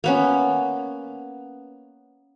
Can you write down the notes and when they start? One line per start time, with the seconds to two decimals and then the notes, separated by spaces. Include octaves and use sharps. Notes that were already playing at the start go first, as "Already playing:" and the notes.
0.04 A#3 B3 C#4